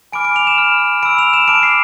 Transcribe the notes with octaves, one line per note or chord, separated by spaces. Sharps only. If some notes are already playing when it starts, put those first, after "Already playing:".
G#5 B5 D6 F6 D7
D7
F7
E7
B5 F6
B5 E6 D7
F7
E7
A5 D6 F6 D7
C7